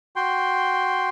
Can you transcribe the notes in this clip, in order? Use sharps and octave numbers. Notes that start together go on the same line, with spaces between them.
F#4 G5 C6